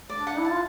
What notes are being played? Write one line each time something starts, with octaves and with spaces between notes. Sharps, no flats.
D5
D4
F#5
E4
A5
F4